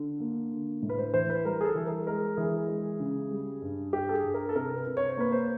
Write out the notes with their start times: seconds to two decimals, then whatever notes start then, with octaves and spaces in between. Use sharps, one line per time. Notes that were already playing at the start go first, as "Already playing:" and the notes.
Already playing: D3
0.20 A#3
0.52 D3
0.83 A2
0.89 B4
0.98 C5
1.13 E3 C5
1.30 B4
1.45 G3 A#4
1.61 G#4
1.65 A4
1.75 E3
1.87 A#4
2.07 G#3 A#4
2.37 E3 G#4
2.68 G#3
3.00 C#3
3.31 G3
3.62 G2
3.93 G2 G4
4.09 A4
4.13 G#4
4.24 G2
4.34 A#4
4.49 A4
4.55 C3 A#4
4.76 B4
4.87 C3
4.97 C#5
5.09 C5
5.17 A#3 B4
5.32 C5